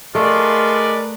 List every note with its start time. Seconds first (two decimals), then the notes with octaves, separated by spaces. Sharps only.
0.15 G#3 A3 F4 A#4 B4 D5